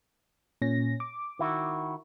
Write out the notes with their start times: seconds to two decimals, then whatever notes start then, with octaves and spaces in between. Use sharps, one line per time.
0.62 A#2 C#4 A#6
1.00 D6
1.39 D#3 E4 F#4